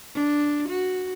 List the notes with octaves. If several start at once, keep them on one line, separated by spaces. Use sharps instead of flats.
D4
F#4